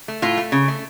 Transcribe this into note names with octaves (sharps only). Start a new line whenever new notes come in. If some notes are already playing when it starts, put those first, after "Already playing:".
A3
A2 F4
A3
C#3
A3